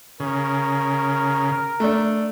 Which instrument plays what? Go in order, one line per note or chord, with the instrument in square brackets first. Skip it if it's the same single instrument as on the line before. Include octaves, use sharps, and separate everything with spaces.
[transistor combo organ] C#3 [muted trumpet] A#4
[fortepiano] A3 D4